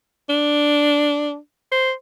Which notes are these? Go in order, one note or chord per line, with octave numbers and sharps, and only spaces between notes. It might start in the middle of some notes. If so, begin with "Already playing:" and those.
D4
C5